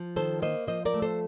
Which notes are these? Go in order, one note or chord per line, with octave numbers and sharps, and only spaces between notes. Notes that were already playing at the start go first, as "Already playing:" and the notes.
Already playing: F3
D#3 A4 C5
A#3 C5 D#5
F3 C5 D#5
A#4 D5
A3
A4 C5